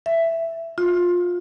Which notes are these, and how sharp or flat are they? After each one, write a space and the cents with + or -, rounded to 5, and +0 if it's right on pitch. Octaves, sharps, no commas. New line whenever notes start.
E5 +5
F4 +20